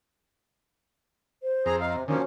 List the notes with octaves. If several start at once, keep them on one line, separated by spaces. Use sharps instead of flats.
C5
F2 C4 G#4 A#5
D#5 F5 A#5
C3
D3 D#3 F3 A#3 C#4 F#4 C#5